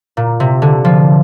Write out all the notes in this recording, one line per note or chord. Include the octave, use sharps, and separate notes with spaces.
A#2
C3
D3
F3